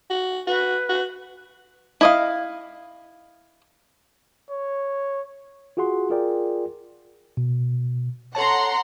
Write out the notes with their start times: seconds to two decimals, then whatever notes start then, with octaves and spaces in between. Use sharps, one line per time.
0.10 F#4
0.47 F#4 B4
0.90 F#4
2.01 E4 D#5 F5
4.50 C#5
5.77 F4 F#4 G#4 F#5 C6
6.10 F4 G#4 A#4 D5 G5
7.37 B2
8.35 A4 C#5 F#5 A5 A#5 C6